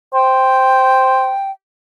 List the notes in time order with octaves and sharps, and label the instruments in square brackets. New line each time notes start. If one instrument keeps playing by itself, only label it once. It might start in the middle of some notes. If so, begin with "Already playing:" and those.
[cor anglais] C5 [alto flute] G5